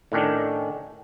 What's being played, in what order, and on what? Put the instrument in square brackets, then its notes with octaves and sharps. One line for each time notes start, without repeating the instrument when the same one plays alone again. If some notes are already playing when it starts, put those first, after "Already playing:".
[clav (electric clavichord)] A2 D#3 C#4 D4